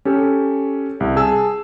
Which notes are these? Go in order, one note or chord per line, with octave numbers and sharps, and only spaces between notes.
C#4 G4 A4
C2
G#4 G#5 A5 E6